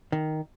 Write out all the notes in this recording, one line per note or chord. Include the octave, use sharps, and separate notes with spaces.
D#3